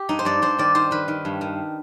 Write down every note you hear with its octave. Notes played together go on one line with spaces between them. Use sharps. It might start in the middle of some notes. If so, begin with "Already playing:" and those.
Already playing: G4
G2 D#4
C5
G2 D5
G2 C5
D#3 D5
D#3 C5
D#3 B4
D#3
G2
D#3